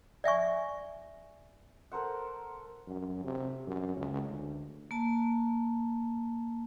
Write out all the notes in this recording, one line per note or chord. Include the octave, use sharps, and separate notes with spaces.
D5 E5 G#5 C#6
A4 A#4 C5 F#5
F#2
C3
F#2
C#2
D2
A#3 A5